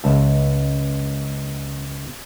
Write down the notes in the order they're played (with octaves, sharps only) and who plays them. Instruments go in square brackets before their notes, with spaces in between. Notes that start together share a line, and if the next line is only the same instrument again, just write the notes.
[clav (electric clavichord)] C#2 E5 A5